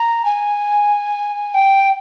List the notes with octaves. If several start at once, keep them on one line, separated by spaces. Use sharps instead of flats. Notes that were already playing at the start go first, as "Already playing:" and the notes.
Already playing: A#5
G#5
G5